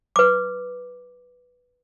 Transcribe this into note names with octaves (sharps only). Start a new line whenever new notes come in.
B4 D6